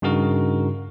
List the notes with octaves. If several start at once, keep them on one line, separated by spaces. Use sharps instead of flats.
G2 C#3 D#4 F#4 A#4